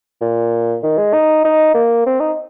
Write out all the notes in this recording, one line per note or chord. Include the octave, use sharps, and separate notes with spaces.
A#2
D#3
G#3
D#4
D#4
A#3
C4
D#4